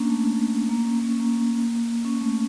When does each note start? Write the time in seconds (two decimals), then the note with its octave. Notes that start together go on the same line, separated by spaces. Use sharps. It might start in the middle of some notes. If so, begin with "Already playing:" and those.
Already playing: A#3 C#4 D4
0.09 A3
0.69 A#3
0.85 C#4
1.00 A#3
1.10 C#4
1.20 A#3
2.05 C#4
2.21 A3